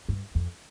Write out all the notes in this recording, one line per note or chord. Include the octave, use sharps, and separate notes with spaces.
G2
F2